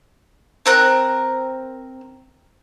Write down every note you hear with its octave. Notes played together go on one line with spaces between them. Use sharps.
C4 A#4 F#6